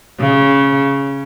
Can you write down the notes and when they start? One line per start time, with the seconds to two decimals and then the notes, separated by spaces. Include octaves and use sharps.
0.20 C#3